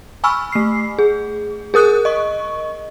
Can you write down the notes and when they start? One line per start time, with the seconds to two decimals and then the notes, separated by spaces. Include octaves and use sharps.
0.24 G#5 B5 C#6 E6 F6
0.52 A3 C7
0.99 G#4
1.74 G#4 A#4 D#6 F#6
2.05 D#5 C#6